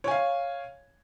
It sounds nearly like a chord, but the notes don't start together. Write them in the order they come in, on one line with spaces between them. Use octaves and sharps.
C#5 G#5 F5